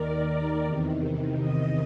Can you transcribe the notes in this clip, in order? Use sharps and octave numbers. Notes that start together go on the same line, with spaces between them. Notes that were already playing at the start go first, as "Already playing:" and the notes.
Already playing: D#2 D#3 A#4 D5
E2 C3 D#3
D#5